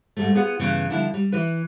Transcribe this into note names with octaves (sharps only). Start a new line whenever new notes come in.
G#2 G3 A3
B3 F4 G#4 B4 F#5
G2 C#3 E3 B3
D3 F3 G3 D4 E4
G3
E3 E4 B4